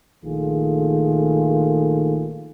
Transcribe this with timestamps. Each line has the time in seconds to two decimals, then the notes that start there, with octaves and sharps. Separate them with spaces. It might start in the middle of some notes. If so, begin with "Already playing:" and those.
0.23 A#1 D#3 A3 F4 G#4